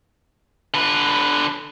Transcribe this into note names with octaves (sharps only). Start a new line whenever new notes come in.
D3 B4